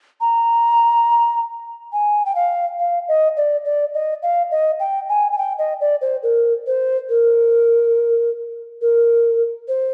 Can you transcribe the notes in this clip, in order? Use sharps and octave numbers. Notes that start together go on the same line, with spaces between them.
A#5
G#5
G5
F5
F5
D#5
D5
D5
D#5
F5
D#5
G5
G#5
G#5
G5
D#5
D5
C5
A#4
C5
A#4
A#4
C5